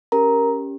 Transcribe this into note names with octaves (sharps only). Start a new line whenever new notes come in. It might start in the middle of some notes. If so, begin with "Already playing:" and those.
C#4 G4 A#4 A#5